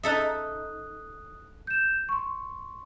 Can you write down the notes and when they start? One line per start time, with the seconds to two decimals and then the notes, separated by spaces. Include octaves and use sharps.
0.03 D#4 A4 E5 D#6 F#6
1.67 G6 E7
2.09 C6 C#6